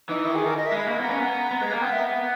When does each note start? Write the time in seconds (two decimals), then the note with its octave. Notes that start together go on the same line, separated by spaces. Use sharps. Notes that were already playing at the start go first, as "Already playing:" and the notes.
0.09 E3 D#4
0.25 D#3 E4
0.35 G#4
0.45 A#4
0.57 D#5
0.67 E5
0.72 G#3 B5
0.88 A#3
0.98 B3
1.03 A#5
1.09 C#4
1.19 B3
1.51 B3
1.61 G#3
1.71 A#3
1.82 B3 G5
1.92 E5